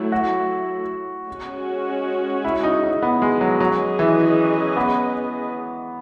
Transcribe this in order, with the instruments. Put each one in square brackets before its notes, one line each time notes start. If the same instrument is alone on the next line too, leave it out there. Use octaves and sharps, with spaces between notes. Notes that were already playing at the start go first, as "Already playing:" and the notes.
Already playing: [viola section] F#3 A3 E4
[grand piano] F#4
[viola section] G#3 C#4 F#4
[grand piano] E4
D#4
D#4
B3
G#3
F#3
[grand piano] F#3 [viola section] C#4 G#4 B4 D#5
[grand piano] E3
B3